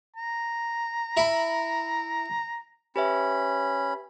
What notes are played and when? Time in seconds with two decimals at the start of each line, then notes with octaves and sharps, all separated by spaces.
0.16 A#5
1.17 E4 B5
2.96 C#4 G4 B4 E5 B5